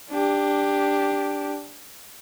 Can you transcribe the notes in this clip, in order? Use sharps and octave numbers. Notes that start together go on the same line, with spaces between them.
D4 G4